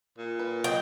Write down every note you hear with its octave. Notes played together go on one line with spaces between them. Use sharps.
A#2
B4
F#3 B3 D#5 G5